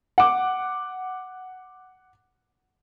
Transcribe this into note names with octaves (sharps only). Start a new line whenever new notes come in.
F#5 D6